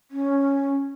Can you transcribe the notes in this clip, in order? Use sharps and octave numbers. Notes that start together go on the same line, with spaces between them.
C#4